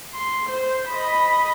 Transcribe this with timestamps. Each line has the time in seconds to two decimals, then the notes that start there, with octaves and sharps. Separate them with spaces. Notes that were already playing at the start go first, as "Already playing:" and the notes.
0.14 C6
0.50 C5
0.88 D#5 B5